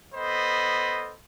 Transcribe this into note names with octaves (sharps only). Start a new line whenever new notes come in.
B3 A4 C5 D#5 B5